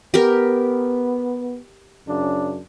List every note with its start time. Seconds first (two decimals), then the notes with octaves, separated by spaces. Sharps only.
0.14 B3 G4 A#4
2.06 F#2 C#3 D4